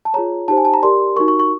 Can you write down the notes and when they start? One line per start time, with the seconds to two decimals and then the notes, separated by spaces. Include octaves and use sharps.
0.05 A5
0.14 F4 G#4 C#5 A#5
0.48 D#4 G4 C5 A5
0.57 G#5
0.65 A5
0.74 A#5
0.82 G4 A#4 D5 C6
1.16 A#4 C#6
1.19 D#4 F#4
1.28 C#6
1.39 C#6